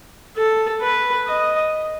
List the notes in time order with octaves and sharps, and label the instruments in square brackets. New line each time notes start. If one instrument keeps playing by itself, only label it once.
[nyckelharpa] A4
B4
D#5